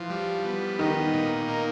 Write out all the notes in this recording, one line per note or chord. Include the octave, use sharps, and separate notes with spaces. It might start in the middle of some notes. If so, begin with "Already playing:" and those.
Already playing: E3 F3
G3
B3
D#3 D#4
A#2
A#3